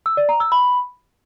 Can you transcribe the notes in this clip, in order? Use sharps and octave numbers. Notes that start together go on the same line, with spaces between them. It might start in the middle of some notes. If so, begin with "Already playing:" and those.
E6
D5
A#5
E6
B5